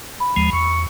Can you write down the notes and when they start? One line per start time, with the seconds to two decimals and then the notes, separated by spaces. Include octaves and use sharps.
0.20 B5
0.36 D#2 F3 G#3
0.53 E2 C#6